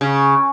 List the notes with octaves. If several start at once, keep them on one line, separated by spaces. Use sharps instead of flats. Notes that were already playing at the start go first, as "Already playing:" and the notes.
C#3